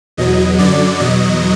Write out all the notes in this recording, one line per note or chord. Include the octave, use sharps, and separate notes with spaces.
E2 B2 F#3 D#5
F#2 D3 F#3 D5
E2 B2 F#3 D#5